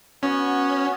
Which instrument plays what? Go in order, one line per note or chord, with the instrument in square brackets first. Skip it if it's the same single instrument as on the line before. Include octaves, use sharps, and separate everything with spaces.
[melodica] B3 F#4 [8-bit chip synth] C#4